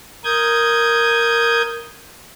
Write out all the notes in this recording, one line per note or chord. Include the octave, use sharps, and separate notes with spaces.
A#4 D#6 G6 G#6